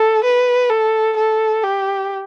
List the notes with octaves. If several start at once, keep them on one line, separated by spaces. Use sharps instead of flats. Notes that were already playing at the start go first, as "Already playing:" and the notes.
Already playing: A4
B4
A4
A4
G4